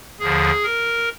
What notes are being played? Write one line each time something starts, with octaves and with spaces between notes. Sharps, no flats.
D#2 D3 F3 G#4
A#4